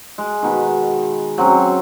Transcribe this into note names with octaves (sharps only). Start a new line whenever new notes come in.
G#3
B2 D#3
F#3 C4 C#4